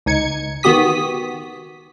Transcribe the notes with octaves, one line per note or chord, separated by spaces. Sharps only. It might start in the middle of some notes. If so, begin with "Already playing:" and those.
C#2 D#4 G#6 C#7
D#3 B3 F#4 G4 D#6 B6